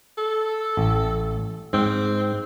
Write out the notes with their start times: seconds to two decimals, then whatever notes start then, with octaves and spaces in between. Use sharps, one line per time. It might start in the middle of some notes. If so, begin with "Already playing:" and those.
0.17 A4
0.77 A1
1.73 G#2 C4